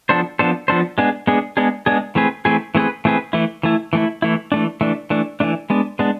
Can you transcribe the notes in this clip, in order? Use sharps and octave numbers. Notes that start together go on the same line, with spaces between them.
F3 B3 D4 A4 C5
F3 B3 D4 A4 C5
F3 B3 D4 A4 C5
G#3 B3 D4 G#4
G#3 B3 D4 G#4
G#3 B3 D4 G#4
G#3 B3 D4 G#4
E3 A3 C4 G#4 B4
E3 A3 C4 G#4 B4
E3 A3 C4 G#4 B4
E3 A3 C4 G#4 B4
E3 A3 E4
E3 A3 E4
E3 A3 E4
E3 A3 E4
E3 A3 D4
E3 A3 D4
E3 A3 D4
E3 A3 D4
G#3 B3 D4
G#3 B3 D4